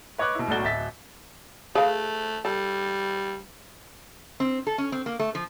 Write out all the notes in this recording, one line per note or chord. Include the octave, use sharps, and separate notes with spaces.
B4 C#5 D#5 D6 F#6
B2 E4
B1 A2 A3 F#4 D5 G7
D1 D#5 E5 A6 B6
A3 G#4 B4 F5
G3 A4
C4
A4
C#4
C4
A#3
A3
F3